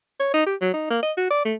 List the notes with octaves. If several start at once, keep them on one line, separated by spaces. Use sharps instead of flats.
C#5
D#4
G4
F#3
D#4
A#3
D#5
F#4
D5
A3